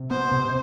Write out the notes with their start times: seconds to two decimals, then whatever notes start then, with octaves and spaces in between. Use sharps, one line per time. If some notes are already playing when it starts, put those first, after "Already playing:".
Already playing: C3
0.11 B3 C5
0.31 C3